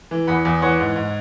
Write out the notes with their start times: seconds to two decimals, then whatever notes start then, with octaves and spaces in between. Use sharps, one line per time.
0.11 E3
0.27 E2 F#5 B5
0.45 E2
0.62 E3 C#5 F#5
0.80 G#2
0.96 G#2